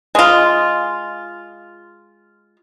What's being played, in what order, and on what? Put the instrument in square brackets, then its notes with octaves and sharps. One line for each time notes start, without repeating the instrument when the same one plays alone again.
[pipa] G#3 F4